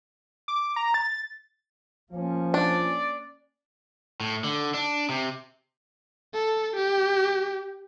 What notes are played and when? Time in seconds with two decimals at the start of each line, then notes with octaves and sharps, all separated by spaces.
0.48 D6
0.76 A#5
0.94 A6
2.13 F3 A#3 C#4
2.54 D4 D5
4.20 A2
4.44 D3
4.74 D4
5.09 C3
6.34 A4
6.76 G4